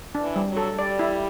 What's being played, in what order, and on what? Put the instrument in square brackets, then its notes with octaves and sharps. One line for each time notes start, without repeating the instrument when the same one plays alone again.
[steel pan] D4
[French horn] E3
[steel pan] G3
[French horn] F#3
[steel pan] A4
[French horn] G3 [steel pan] D5
[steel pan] E4